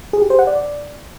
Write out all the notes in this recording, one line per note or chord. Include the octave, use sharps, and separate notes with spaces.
G#4
G4
C5
F#5
D5